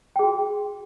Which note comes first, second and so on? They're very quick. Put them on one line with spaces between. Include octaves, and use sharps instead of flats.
G5 G#4 F#4